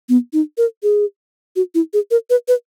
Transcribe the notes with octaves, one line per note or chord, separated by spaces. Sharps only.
B3
D#4
A#4
G#4
F#4
E4
G#4
A#4
B4
B4